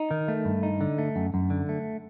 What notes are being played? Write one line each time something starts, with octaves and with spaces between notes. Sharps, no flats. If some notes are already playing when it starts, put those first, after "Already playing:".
Already playing: D#4
D#3
A3
G2
D#4
D3
A3
F#2
F#2
D3
A3